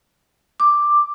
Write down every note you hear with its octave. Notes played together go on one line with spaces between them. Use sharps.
D6